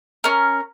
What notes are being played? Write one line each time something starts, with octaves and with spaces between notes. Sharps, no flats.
C#4 A#4